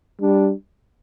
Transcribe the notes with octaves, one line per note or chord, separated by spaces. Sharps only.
G3 D4